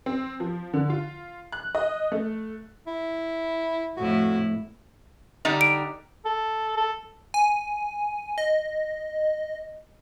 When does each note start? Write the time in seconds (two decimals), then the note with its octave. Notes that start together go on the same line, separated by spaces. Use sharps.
0.06 C4
0.40 F3
0.74 D3
0.90 F4
1.52 F#6
1.75 D#5
2.12 A3
2.87 E4
3.97 F2 A2 E4 F#4
5.45 D3 G3 D#4
5.61 D7
6.25 A4
6.77 A4
7.34 G#5
8.38 D#5